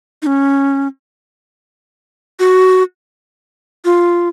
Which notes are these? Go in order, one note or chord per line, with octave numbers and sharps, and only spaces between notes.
D#4
C#4
F#4
F4